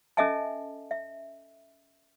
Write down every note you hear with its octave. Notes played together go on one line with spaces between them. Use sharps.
C#4 A4 D#5 E5 G#5 A5
E5